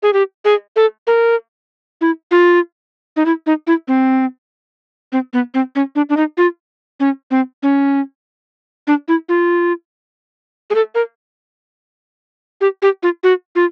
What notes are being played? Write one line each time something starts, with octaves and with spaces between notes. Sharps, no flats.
G#4
G4
G#4
A4
A#4
E4
F4
D#4
E4
D#4
E4
C4
C4
B3
C4
C#4
D4
D4
D#4
F4
C#4
C4
C#4
D4
E4
F4
G#4
A4
A#4
G4
G4
F4
F#4
F4